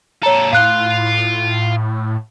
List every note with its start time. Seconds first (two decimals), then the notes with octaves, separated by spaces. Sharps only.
0.23 A#2 A4 C#5 A#5
0.53 A2 F4 F5 C6 F#6